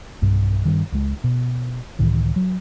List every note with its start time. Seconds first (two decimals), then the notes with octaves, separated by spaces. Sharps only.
0.22 B1 G2
0.65 G2 D#3
0.92 C#2 G#3
1.24 B2
1.99 C#2 A2 D#3 E3
2.36 F#3